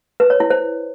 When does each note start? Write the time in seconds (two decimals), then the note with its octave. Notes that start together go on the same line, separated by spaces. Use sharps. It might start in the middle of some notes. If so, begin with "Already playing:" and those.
0.20 B4
0.30 C#5
0.40 E4
0.50 C5